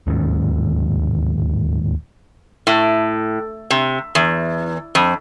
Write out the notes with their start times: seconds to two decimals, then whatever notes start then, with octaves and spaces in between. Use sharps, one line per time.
0.07 D1 D#2 G#2 C#4
2.67 A2
3.70 C3
4.15 E2
4.95 F2